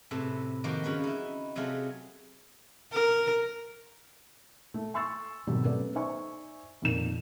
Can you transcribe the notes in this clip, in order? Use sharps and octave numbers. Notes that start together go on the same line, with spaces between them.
A2 C3 A4 B4
D#3 F3 A#3 F#4 G4
C#3 F#3 F#4 B4
D#4 E4
C3 F#3 A3 G#4 F5 C6
A#4
A3
G#5 C6 C#6 E6 A6
G#1 B2 F#3 G4 A4
A3 B3 C#4 A4 B4 D5
D#4 C5 D5 E5 G#5 C#6
F2 A#2 D#3 A#4 E7